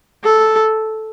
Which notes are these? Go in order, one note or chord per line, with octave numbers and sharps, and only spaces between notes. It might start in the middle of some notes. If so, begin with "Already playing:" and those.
A4